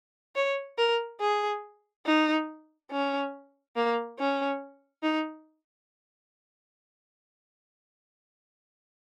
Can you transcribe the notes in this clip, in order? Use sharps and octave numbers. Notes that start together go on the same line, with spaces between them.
C#5
A#4
G#4
D#4
C#4
A#3
C#4
D#4